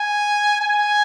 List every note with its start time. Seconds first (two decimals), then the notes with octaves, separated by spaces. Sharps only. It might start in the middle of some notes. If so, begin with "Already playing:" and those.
Already playing: G#5
0.61 G#5